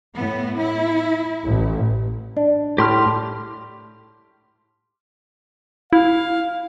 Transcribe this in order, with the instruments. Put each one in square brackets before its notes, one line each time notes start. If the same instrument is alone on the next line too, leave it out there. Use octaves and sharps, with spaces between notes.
[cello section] A2 B3
E4
[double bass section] A1
[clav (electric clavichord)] D4
[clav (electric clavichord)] A2 [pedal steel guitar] G4 C6 F6
[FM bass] E4 [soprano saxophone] F5